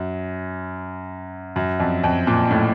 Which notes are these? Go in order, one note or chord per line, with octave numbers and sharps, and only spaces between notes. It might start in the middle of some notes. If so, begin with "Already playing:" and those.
Already playing: F#2
F#2
F2
F2
A#2
A2